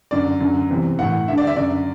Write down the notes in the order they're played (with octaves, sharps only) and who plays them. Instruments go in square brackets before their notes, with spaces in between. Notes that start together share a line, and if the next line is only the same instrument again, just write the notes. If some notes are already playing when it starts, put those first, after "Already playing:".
[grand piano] F#2 D3 D5
F#2 D3
E2 C3 E3
E3 F#5
A2
G2 E5
D3
D5
E5
F#2 D3 D5